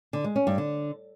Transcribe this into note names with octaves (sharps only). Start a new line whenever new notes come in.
D3
G#3
C#4
G2
D3